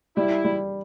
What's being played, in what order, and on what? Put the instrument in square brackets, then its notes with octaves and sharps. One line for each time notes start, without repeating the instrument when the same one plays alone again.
[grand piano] G3 [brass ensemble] E4
[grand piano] G3